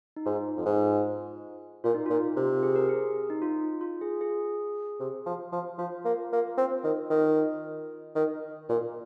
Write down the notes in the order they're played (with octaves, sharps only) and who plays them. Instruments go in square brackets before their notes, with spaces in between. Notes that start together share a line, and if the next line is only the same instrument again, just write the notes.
[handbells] D#4
[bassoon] G#2 [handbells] F4
[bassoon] F2
G#2
[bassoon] A#2 [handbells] F4
[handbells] D#4
[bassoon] A#2 [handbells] F4
[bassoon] C3
[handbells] G#4
A#4
G#4
D#4
F4
F4
G#4
G#4
[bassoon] C3
F3
F3
[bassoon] F3 [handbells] F4
[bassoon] A#3
A#3
C4
D#3
D#3
D#3
A#2